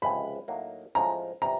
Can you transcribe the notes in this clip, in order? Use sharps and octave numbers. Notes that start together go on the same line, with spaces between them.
C#2 C3 F3 G#3 C#4 B5
A2 F#3 A#3 D#4
A2 F3 G#3 C#4 A#5
C3 E3 G3 A#5